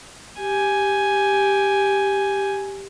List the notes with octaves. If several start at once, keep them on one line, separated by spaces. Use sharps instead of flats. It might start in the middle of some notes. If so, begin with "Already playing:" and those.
G4 G#5